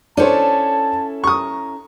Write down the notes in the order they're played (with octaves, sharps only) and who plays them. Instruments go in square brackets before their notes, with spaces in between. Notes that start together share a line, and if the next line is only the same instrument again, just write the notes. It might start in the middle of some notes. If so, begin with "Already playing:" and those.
[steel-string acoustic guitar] C#4 E4 A4 [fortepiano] D4 C5 C#5 [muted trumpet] A5
[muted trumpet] A#5 [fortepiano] C#6 D#6